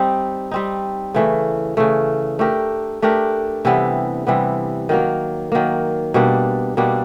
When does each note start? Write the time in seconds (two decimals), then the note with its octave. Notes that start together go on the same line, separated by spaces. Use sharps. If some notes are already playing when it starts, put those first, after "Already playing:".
Already playing: G3 C4 D#4
0.51 G3 C4 D#4
1.14 C#3 E3 A3
1.77 C#3 E3 A3
2.39 A3 D4 G4 A#4
3.02 A3 D4 G4 A#4
3.65 C3 E3 G3 B3
4.27 C3 E3 G3 B3
4.89 D#3 F#3 A#3
5.52 D#3 F#3 A#3
6.14 B2 G3 A#3 D4
6.77 B2 G3 A#3 D4